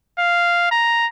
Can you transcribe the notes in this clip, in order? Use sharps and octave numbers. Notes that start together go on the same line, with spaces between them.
F5
A#5